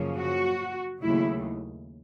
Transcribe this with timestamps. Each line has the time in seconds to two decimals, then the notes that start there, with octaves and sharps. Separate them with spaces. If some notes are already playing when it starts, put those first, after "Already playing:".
Already playing: F#2 C#3 F3 A#3 C#4
0.15 F#4
1.01 D#2 C#3 F#3 A3 E4